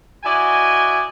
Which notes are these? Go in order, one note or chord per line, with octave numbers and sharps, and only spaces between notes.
E4 F#4 D5 D#5 G#5